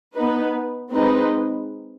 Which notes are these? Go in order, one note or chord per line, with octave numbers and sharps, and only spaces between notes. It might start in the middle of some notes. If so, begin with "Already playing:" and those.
B3 D#4 B4
G#3 C4 D#4 B4